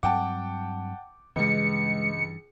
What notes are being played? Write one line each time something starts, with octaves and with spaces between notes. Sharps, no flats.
G2 F#3 C4 F#5 G5 A5 D6
C#2 G2 E3 G#3 B4 C#7